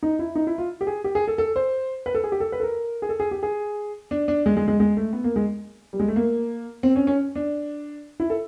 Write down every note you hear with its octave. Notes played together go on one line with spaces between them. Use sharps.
D#4
E4
D#4
E4
F4
G4
G#4
G4
G#4
A4
A4
C5
B4
A4
G#4
G4
A4
B4
A4
A#4
G#4
A4
G#4
G4
G#4
D4
D4
G#3
G#3
G#3
G#3
A3
B3
A#3
G#3
G3
G#3
A3
A#3
C4
C#4
C#4
D4
E4
A4